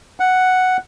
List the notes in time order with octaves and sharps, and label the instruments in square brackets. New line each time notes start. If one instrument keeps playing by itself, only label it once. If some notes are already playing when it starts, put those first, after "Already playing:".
[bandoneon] F#5